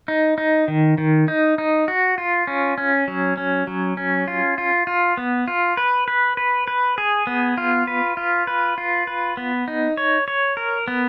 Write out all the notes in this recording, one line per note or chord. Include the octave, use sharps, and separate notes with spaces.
D#4
D#4
D#3
D#3
D#4
D#4
F#4
F4
C#4
C#4
F#3
C#4
F#3
C#4
F4
F4
F4
B3
F4
B4
B4
B4
B4
G#4
B3
F4
B4
F4
B4
F4
B4
B3
D#4
C#5
C#5
A#4
B3